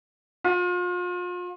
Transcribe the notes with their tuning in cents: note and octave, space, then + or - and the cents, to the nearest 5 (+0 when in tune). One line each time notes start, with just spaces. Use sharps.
F4 +35